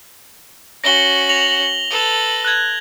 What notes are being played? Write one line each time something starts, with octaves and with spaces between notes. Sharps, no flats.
C#4 F#4 A#6 G7
A#6 F7 F#7
A4 B4
F#6 G#6